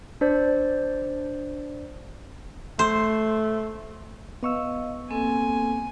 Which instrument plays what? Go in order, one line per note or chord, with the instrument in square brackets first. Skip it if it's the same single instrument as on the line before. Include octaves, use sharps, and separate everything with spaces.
[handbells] D4 C5 D5
[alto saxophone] A3 [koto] C5
[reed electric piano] B3 C#6 E6 [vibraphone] D#5 F5
[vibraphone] A#3 C4 A4 [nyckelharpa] G#5